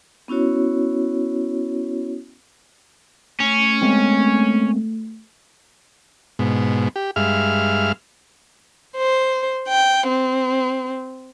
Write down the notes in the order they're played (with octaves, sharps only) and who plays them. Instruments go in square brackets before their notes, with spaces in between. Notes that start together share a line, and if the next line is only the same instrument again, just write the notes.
[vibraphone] B3 C#4 E4 F#4 C#5
[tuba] A3 [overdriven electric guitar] C#4
[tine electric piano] G#3 B3 C4
[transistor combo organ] G#2 B2
G4
G2 G#3 E5 F5 F6
[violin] C5
G5
C4